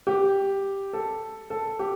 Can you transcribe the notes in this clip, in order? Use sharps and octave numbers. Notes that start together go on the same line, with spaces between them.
G4
A4
A4
G4